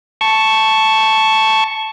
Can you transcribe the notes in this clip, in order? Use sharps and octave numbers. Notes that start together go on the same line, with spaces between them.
A5 C#6